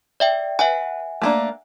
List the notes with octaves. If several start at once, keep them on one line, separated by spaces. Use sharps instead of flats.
D5 E5 G5
B4 E5 F#5 G#5
A3 A#3 D4